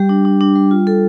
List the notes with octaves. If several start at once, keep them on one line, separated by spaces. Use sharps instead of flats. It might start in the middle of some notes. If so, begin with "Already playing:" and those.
Already playing: G3 G4
D4
D4
D4
G3
F4
A4